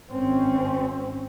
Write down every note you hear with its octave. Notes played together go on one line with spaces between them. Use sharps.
G#1 C4 C#4